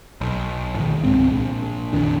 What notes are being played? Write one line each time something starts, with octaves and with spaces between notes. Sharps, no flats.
B1
A2 D#3
C2 G#2 G#3 C4
A#1
F2 A#2 D#3 D4